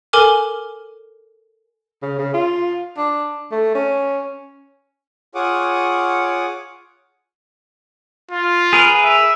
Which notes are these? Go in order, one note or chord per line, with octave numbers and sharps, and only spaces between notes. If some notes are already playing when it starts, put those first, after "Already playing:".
A4 A#4 G#5 D6 F6
C#3
C#3
F4
D4
A3
C#4
F4 G#4 C#5 F#5 D6 D#6
F4
G#4 A#4 B4
E5